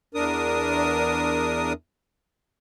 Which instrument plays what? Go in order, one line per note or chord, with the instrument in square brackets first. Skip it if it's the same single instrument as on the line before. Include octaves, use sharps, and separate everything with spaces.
[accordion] E2 D4 A#4 D#6